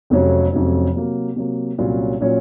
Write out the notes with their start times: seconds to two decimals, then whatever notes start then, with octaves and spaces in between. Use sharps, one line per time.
0.10 F1 F2 C3 F#3 C#4
0.52 F1 F2 C3 F#3 C#4
0.95 C3 F#3 A#3
1.36 C3 F#3 A#3
1.78 C2 A#2 F#3 C#4 F4
2.21 A#2 F#3 C#4 F4